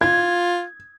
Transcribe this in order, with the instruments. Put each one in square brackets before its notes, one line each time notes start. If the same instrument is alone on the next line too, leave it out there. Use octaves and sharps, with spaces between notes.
[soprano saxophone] F4 [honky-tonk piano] G#6